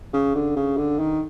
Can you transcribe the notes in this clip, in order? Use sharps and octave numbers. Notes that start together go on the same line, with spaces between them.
C#3
D3
C#3
D3
D#3